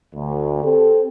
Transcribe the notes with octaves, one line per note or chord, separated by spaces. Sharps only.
D2
C4 G4 A4